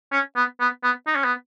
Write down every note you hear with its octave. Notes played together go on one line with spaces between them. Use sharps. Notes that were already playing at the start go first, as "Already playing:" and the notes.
C#4
B3
B3
B3
D#4
C#4
B3